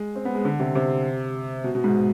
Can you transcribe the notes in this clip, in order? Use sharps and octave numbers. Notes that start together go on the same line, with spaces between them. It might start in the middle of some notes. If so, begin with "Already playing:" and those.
Already playing: G#3
C4
B3
G#3
D3
C3
C3
B2
B2
G#2